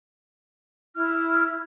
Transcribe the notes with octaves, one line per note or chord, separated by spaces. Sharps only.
E4 F6